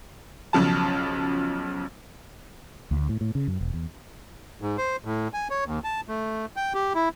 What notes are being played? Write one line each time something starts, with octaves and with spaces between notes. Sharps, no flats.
B1 C#3 F3 A5
D2
A2
A2
C#3
F#2
E1
E2
G#2
C5
A2
G#5
C#5
D#2
A5
A3
G5
G4
E4